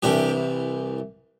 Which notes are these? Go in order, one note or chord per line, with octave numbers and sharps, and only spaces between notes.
C2 C3 E3 D4 G4